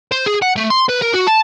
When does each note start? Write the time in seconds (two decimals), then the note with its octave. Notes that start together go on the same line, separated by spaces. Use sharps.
0.12 C5
0.26 G#4
0.42 F#5
0.56 A3
0.70 C6
0.89 B4
1.02 A#4
1.13 F#4
1.27 A5